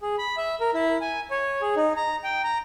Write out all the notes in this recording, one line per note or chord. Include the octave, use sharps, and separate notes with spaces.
G#4
B5
E5
A#4
E4
G#5
C#5
G#4
D#4
A#5
G5
A#5